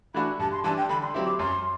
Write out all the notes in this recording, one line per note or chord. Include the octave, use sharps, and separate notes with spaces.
E3 A3 D4 F#4 B5
G2 A5
C6
E3 G3 D4 A5
G5
D3 B5
C6
F#3 C4 E4 G4
D6
F#2 C6